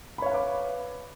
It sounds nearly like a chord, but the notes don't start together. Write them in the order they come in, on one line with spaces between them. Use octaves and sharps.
B5 C#5 F5 B4 D6